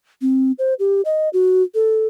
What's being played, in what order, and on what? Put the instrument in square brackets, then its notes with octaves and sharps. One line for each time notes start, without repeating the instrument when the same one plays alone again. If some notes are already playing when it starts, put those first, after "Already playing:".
[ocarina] C4
C5
G4
D#5
F#4
A4